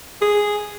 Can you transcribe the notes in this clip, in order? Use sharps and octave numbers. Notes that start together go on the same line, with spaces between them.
G#4